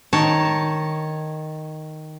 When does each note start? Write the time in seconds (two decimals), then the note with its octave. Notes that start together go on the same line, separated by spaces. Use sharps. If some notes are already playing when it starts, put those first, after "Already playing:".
0.13 D#3 C#5 A5